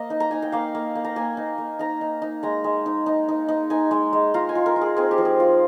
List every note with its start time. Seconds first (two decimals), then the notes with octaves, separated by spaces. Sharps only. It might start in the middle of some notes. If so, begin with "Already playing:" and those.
Already playing: A#3 D#5
0.10 D#4
0.20 A#5
0.31 D#4 G#5
0.42 G5
0.52 A#3 F5
0.75 A#3
0.95 A#3
1.04 A#5
1.16 A#3 G#5
1.37 D#4
1.58 A#3
1.79 D#4 A#5
2.01 D#4
2.22 D#4
2.43 G#3 A#5
2.64 G#3
2.86 D#4
3.06 D#4
3.29 D#4
3.48 D#4
3.70 D#4 G#5
3.91 G#3
4.13 G#3
4.34 F4 A#5
4.49 G#5
4.55 F4
4.66 A#4
4.76 F4
4.81 G#4
4.97 C4 G#4
5.11 G4
5.18 F3
5.25 G#4
5.40 F4